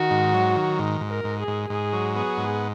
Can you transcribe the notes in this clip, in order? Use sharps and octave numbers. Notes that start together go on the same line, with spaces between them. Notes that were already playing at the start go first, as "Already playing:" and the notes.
Already playing: D#3 F#4
G#2
F#3
D#3
G#2
G#2
A#4
G#2
G#4
G#2
G#2 G#4
F#3
B3 G#4
G#2